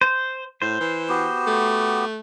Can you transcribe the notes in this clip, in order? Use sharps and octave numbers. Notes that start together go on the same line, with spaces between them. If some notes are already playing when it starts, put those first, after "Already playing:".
C5
A2 C5
E3
B3 F#4 G4
A3